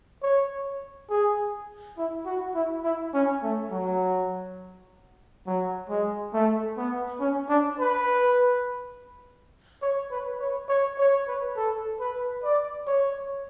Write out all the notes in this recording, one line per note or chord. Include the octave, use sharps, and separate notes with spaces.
C#5
G#4
E4
F#4
E4
E4
C#4
A3
F#3
F#3
G#3
A3
B3
C#4
D4
B4
C#5
B4
C#5
C#5
C#5
B4
A4
B4
D5
C#5